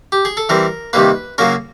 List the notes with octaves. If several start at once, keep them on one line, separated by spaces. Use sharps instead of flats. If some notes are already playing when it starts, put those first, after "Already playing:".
G4
G#4
A4
E3 G3 C4 A#4
C3 D#3 G3 A#3 B4
C#3 F#3 A#3 C#4 A#4